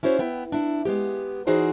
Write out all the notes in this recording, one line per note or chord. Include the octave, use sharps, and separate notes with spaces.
C#4 E4 F#4 C5 C#5
B3 E4 G5
D4 E4
G#3 B3 G4
E3 D#4 F#4 G#4 C5 D5